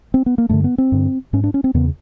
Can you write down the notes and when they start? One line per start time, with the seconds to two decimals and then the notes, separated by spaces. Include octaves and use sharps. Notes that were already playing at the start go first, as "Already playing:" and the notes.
0.14 C4
0.26 B3
0.38 A#3
0.49 G2 D3 A3
0.64 B3
0.78 C4
0.92 G2 D3
1.33 G#2 C#4
1.44 D4
1.54 C#4
1.64 C4
1.74 E2 C#3 B3